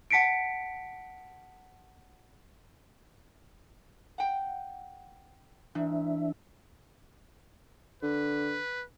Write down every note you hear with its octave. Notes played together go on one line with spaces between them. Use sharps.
F#5 A5 B6 C#7 D7
F#5 G5
G#2 E3 D4 E5
D3 B4